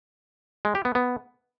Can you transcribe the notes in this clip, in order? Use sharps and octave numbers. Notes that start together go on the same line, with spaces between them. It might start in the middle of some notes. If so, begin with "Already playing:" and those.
G#3
G4
B3
B3